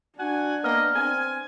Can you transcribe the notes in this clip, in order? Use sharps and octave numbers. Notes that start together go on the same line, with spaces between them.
D4 F#4 F#5 G#5
A#3 B3 D#5 F6
C4 G#5